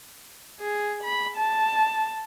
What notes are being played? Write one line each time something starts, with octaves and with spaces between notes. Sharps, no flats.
G#4
B5
A5